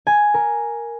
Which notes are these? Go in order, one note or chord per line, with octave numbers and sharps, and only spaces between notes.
G#5
A#4